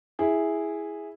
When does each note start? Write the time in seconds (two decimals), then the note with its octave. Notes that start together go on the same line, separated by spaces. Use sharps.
0.19 E4 G#4